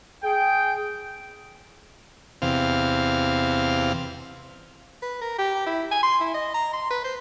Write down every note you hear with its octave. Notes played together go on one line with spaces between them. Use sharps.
G#4 G5
E2 C3 F5
B4
A#4
G4
E4
G#5
C6
E4
D#5
A#5
C6
B4
C5